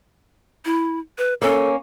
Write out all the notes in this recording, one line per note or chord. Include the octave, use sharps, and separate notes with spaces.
E4
B4
A#3 C#4 A4